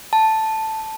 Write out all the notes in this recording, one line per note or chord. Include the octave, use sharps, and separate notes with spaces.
A5